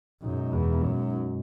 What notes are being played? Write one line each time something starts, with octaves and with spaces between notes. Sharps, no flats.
F#2 B2 G#3 D#4
E2
F#2